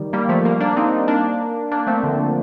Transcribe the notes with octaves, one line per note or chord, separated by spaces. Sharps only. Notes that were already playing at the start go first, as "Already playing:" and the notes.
Already playing: D#3 G3
G3 A#3
F3 A3
G3 A#3
A#3 D4
C4 D#4
A#3 D4
A#3 D4
A3 C4
D3 F3